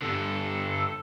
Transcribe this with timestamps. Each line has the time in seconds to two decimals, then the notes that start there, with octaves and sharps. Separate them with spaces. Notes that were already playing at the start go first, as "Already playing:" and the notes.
0.03 G2 D3 A4